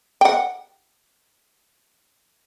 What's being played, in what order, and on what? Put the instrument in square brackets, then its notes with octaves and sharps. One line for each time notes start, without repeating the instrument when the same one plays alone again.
[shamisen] F#5 G5